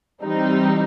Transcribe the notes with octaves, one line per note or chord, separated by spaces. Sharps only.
E3 G3 C4 D#4